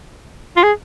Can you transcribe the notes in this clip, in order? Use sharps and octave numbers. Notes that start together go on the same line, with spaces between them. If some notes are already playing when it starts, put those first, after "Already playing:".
F4
G#4